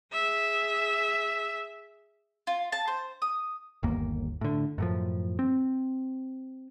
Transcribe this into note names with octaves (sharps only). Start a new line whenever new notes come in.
G#4 E5
F4
A5
C5
D#6
G1 D#2 A#3
A2 D3
F#2 A2 F3
C4